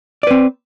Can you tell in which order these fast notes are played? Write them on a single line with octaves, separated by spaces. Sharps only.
D5 B4 C4